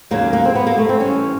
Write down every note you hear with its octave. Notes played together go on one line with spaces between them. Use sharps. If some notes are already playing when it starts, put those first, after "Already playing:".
D#2 C#3 F#3 A#3
A#3
C4
B3
A#3
A3
C4
G2 E3 C#4